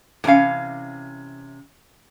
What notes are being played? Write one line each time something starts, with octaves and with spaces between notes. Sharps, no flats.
A2 C3 E3 C#4 F5